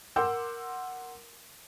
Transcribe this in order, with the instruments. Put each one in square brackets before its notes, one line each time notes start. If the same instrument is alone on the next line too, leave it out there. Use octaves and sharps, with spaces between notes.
[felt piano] A#4 F#5 C6 D6 E6 G6